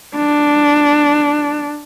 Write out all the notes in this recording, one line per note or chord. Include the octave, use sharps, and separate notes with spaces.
D4